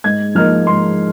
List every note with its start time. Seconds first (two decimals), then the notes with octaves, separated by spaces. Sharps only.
0.04 G#2 G#6
0.35 F3 A#3 D#4 F6
0.67 G#2 C6